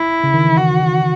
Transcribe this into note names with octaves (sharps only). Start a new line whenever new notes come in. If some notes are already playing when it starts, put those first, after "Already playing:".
Already playing: E4
C#3
D#3
E3
F#4